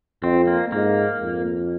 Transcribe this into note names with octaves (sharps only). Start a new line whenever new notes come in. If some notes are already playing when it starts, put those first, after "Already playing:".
F2 C4
A#3
G#2 A#3
F2